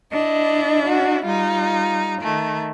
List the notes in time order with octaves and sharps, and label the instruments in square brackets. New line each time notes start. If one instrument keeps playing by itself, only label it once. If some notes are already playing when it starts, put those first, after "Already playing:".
[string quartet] D4 E4 [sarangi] D#5
[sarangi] F#4
[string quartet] G3 D#4 [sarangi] F4
[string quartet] D#3 A3